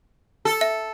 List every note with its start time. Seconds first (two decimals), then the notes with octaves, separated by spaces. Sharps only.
0.45 A4
0.61 E5